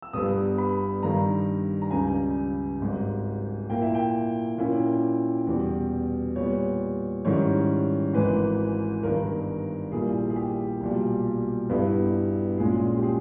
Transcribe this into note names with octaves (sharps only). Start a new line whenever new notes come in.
E6
G1 G2 G3 B3 D#6
B5
G2 D#3 G3 A#5
A#5
C#2 C#3 G3 G#5
G#1 G#2 G3
A#2 A#3 E4 G5
E5
G5
A#2 A#3 C#4 E4
E2 B2 G3
A#2 G3 B3 C#5
G#2 D#3 G3 C#4 E4 C#5
G#1 G#2 E3 G#3 B4
G1 G2 D#3 A#4
A#1 A#2 G3 A#3 E4 G#4
G#4
G4
B1 A#2 G3
G1 G2 G3 B3 E4
A#1 A#2 G#3 C#4 G#4
G4
G#4